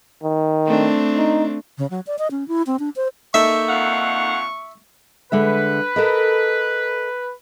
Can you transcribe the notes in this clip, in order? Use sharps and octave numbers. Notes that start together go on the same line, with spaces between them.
D#3
A3 C4 D4
D#4
C#3
F#3
D5
D#5
C#4
E4
C4
D4
C5
A#3 D#4 A4 E5 C#6
F2 F5 F#5
D3 G#3 B4 E5
A4 A#4 D#5